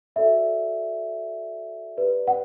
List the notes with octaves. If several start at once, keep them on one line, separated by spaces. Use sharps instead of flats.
F#4 A4 D5 E5
G4 B4 D5
F#5